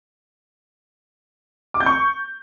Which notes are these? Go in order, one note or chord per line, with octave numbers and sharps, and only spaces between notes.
D6
G6
C#6